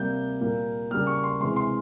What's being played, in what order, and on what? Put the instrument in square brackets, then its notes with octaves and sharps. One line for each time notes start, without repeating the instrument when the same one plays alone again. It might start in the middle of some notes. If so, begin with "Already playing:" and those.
Already playing: [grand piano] C3 G3 A#3 G6
A#2 G3 A#3
C#3 G3 A#3 F6
C#6
C6
C3 E3 G#3 C6
C6